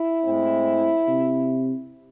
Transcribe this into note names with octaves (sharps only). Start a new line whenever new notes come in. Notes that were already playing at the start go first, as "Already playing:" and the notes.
Already playing: E4
A2 G#3 C4
C3